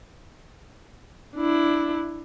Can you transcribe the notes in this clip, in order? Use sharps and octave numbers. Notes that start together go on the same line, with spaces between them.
D4 E4